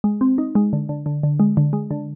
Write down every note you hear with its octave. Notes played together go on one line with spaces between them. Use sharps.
G#3
C4
D#4
G#3
D3
D3
D3
D3
G#3
D3
G#3
D3